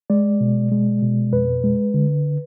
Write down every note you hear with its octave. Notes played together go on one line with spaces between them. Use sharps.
G#3 D5
B2
G#3
B2
F2 B4
G#3
D3